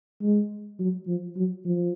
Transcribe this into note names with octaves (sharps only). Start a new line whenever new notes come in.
G#3
F#3
F3
F#3
F3